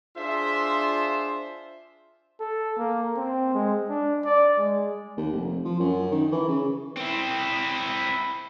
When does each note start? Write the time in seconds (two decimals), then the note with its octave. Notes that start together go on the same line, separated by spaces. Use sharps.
0.16 D4 F4 G#4 C5 E5
2.40 A4
2.78 A#3
3.16 C4
3.54 G#3
3.89 D4
4.24 D5
4.58 G#3
5.17 D#2
5.33 F1
5.65 F3
5.80 F#2
6.11 D#3
6.32 E3
6.48 C#3
6.96 C4 E4